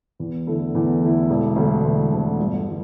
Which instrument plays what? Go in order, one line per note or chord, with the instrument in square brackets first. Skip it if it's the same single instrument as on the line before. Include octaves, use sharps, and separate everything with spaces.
[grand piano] E2
D3 A3 E4
E2
D3 A3 E4
E1
D2 D3 A3
E1
D2 D3 A3
G1
E3 G3